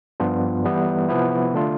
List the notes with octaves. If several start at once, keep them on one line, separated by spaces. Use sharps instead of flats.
G2 F3 B3 D4 F4
E3 G3 B3 E4
C3 F3 B3 E4
D3 A3 D4 F4